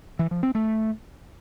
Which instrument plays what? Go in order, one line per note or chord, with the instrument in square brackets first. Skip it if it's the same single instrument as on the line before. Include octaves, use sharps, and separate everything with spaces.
[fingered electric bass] E3
F3
C4
A3